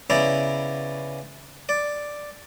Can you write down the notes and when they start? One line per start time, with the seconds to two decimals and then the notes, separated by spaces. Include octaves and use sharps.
0.10 C#3 B3 E4 D5 E5 A#5
1.69 D5